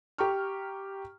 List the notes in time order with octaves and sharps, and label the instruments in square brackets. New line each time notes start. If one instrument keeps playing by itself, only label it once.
[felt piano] G4 A#5 C#6 F6